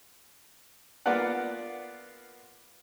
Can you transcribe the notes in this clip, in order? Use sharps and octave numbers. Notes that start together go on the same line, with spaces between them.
A#3 B3 F4 D5 F#5